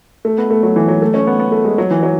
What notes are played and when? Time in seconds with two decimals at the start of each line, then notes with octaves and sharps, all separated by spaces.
0.25 A3
0.38 B3
0.50 A3
0.63 F#3
0.76 E3
0.88 F#3
1.02 A3
1.14 C#4
1.27 B3
1.39 B3
1.52 A3
1.65 G#3
1.78 F#3
1.91 E3
2.03 F#3